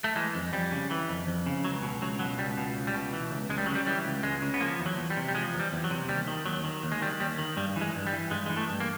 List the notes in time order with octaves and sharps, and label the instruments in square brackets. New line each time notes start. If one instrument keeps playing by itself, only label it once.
[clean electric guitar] A3
E3 G#3
F2
F2 G3
C#3
E3
F2
F2
C#3
C#2 F#3
B2
C#2 F#3
B2 F#3
C#2 G3
B2
C#2
G3
B2
E3
C#2
C#2 G#3
G3
C#3 F#3
G3
E3 G3
C#2
C#2 G#3
C#3
B3
F3 A#3
E2
F#3
E2
G3
C3
G3
F3 G#3
E2
G3
E2
F#3
C3
D#2 G3
D#3
D#2 F#3
D#3
D#2
G#3
D#3 G3
D#2 G3
D#3
G2 G3
E3
G#3
G2
G3
E3
G2 G#3
E3 G#3
A3
G2
A#3